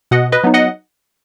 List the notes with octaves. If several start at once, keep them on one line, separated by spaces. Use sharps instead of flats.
B2 D#5 F#5
B4 D#5
F#3 B3 D#4
D#5 F#5